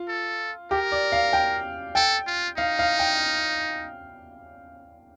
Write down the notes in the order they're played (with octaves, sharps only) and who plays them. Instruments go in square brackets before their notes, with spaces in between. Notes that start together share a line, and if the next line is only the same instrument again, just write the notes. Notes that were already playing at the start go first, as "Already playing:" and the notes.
Already playing: [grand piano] F4
[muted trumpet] A4
[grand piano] G4 [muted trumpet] A#4
[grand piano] D5
F5
G5
[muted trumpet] A4 [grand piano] G5
[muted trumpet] F4
[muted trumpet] D#4 [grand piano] F5
[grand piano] F5
G5